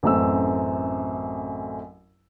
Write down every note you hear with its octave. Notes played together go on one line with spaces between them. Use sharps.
A1 F#2 A3 C4 E6